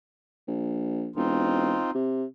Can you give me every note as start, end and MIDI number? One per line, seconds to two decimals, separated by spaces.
0.48 1.10 34
1.16 1.76 28
1.16 1.91 60
1.16 1.91 63
1.16 1.91 65
1.95 2.24 48